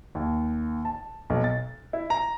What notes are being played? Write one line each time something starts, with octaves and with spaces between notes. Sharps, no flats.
D#2
A5
B1
A6
E4
A#5